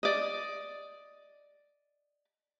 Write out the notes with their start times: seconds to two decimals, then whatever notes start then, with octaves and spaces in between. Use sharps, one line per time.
0.03 D5 D#5